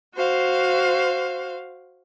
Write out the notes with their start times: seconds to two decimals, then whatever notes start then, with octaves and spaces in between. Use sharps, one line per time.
0.15 F#4 C5 F5